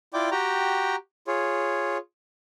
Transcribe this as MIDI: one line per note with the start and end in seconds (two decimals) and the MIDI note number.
0.14 0.30 64
0.14 0.30 65
0.14 0.30 74
0.14 0.30 79
0.14 0.30 86
0.31 0.96 66
0.31 0.96 67
0.31 0.96 79
0.31 0.96 82
1.27 1.98 65
1.27 1.98 68
1.27 1.98 73